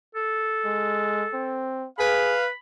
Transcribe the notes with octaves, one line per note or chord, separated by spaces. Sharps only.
A4
G#3
C4
G#4 B4 F5 B5